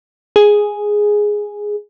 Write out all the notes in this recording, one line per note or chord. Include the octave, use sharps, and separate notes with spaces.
G#4